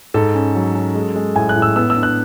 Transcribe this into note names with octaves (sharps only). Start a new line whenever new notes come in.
G#2 A4
C#4
F#3
C#4
G#3
G#3
A2 G#5
F#6
A2
E6
B3 E6
E6
D4
F#6